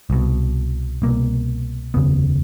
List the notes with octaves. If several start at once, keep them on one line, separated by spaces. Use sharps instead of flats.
C2 B2
C2 B2 A#3
F1 D#2 C#3 B3